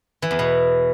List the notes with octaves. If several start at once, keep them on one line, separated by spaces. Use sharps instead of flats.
E3
E2
B2